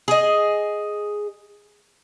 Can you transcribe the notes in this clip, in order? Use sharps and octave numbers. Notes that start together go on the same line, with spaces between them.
G#4 D#5